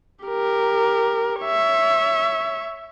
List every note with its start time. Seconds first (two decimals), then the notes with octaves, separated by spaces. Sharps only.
0.25 G4 A#4
1.41 C#5 E5